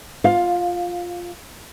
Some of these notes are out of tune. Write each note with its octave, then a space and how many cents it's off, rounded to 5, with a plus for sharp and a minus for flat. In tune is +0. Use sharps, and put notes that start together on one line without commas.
F4 +0 F5 +20